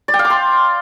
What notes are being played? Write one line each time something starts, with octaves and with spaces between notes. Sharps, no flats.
D5
G5
F5
D6
C6